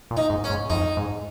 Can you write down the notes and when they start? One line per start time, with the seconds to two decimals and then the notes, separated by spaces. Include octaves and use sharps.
0.11 A#2
0.17 D#4
0.30 G#2
0.44 C#4
0.50 G#2
0.70 F2 D#4
0.97 G#2